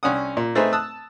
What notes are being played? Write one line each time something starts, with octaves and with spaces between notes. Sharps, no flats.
C2 C#4 D4 F#5 D#6
A#2
A3 C4 D#4 G#4 B4 C5
A5 D#6 E6 F#6